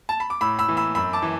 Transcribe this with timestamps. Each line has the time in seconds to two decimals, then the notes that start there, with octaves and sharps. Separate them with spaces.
0.09 A5
0.20 B5
0.30 D6
0.41 A2 B5 E6
0.59 B5 E6
0.68 E3
0.77 B5 E6
0.95 F#2 B5 E6
1.13 A5 D6
1.22 E3